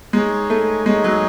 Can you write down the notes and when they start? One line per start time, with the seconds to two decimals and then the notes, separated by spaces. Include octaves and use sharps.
0.13 G#3 D#4 G#4 C#5
0.50 A3
0.85 G#3 D#4 G#4 C#5
1.04 F#3